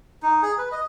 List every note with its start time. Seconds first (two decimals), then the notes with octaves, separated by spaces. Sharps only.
0.23 D#4
0.42 G#4
0.58 B4
0.72 D#5